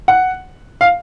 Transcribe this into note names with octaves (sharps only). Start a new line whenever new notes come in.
F#5
F5